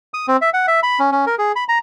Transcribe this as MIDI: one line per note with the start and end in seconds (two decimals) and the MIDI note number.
0.14 0.26 87
0.28 0.37 60
0.42 0.50 76
0.53 0.66 78
0.68 0.80 76
0.83 0.99 83
0.99 1.11 61
1.12 1.25 61
1.27 1.35 70
1.38 1.52 68
1.56 1.64 83
1.69 1.78 82